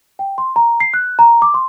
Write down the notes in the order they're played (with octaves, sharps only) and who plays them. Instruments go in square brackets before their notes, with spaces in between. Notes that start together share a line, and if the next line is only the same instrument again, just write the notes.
[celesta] G5
C6
A#5
C7
F#6
A#5
D6
C6